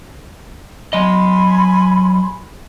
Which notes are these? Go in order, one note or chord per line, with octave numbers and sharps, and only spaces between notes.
F#3 D#5 G#5 B5 C6